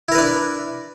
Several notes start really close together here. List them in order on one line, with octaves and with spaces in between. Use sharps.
E4 A#4 B4 D4